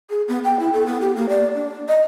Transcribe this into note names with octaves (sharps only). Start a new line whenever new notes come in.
G#4
B3
G5
E4
A4
B3
G4
A#3
D5
D4
D#5